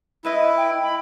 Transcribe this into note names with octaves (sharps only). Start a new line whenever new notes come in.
G#3 E4 B4 D#5
G5
B5